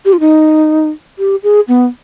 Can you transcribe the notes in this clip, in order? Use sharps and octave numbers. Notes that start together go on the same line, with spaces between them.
G4
F4
D#4
G4
G#4
B3